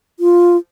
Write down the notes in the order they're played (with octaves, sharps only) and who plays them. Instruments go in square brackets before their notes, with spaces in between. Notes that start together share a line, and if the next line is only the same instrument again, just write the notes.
[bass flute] F4